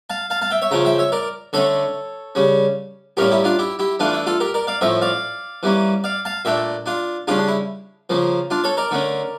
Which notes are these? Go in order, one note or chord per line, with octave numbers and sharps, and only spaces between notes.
F5 A5
F5 A5
F5 A5
E5 G5
C#5 E5
C#3 F3 C#4 G5 A#5
E5 G5
C#5 E5
A#4 D5
D3 A3 C#4 A4 C#5
C#3 G3 C#4
A2 G3 A#3 C#4 G4 A#4
E4 G4
D4 F4
E4 G4
E4 G4
E3 A3 D4 F4
E4
F4 A4
G4 A#4
A#4 D5
D5 F5
A2 F3 C#4 E5 G5
D5 F5
E3 G3 A#3 C#4
D5 F5
F5 A5
A#2 A3 D4 E5 G5
D4 F4
C#3 G3 C#4 D4 F4
D4
E4
C#3 F3 A#3
D4 F4
A4 C#5
A#4 D5
D3 A3 C#4